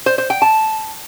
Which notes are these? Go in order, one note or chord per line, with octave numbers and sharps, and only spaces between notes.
C5
C5
G5
A5